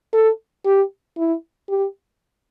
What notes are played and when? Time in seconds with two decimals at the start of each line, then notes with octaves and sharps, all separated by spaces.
0.14 A4
0.66 G4
1.18 E4
1.69 G4